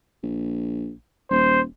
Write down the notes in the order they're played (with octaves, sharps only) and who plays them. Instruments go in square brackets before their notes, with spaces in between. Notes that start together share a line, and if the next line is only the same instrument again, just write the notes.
[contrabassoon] A#1
[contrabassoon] D#1 [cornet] C5